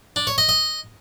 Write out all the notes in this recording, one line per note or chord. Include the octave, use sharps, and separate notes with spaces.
D4
C#5
D#5
D#5